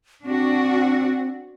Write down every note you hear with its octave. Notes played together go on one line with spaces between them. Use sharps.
C4 D4 F#4